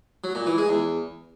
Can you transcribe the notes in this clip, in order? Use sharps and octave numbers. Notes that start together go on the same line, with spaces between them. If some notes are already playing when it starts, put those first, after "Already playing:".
F#3
A#2
E3
G#3
E2